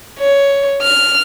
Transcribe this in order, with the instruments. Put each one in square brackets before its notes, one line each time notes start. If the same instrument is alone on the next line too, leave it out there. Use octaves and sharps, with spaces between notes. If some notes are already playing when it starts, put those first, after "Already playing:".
[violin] C#5
F6